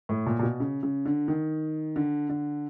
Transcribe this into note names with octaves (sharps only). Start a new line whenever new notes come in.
A2
A#2
A#2
B2
C#3
C#3
D3
D#3
D3
D3